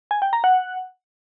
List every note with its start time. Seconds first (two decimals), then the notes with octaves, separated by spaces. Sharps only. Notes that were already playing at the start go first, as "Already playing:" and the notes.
0.11 G#5
0.22 G5
0.33 A#5
0.44 F#5